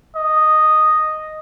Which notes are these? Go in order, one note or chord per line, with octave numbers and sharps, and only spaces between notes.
D#5